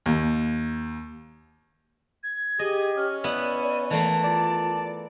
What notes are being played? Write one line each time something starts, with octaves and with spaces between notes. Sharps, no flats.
D#2
G#6
G4 G#4 D#5
C#4 F6
B3 E4 D5 F#5 D#7
E3 A3 A#3 A5
F4 D5